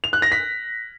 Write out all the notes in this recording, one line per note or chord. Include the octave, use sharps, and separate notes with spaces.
F7
F#6
A#6
B6